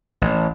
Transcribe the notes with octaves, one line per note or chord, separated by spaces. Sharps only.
A1